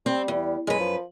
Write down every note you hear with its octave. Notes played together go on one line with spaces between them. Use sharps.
G3 C4
E2
F#2 G#3 B4
F3